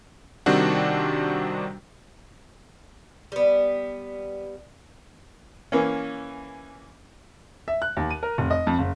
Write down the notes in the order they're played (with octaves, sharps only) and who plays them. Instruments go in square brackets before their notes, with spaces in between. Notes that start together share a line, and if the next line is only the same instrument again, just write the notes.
[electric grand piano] C3 D#3 G3 C4 D4 F#4
[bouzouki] G3 B3
[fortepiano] E3 A#3 C#4
[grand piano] E5
F#6
D#2
D#7
A#4
F1
D#5
F2
F#1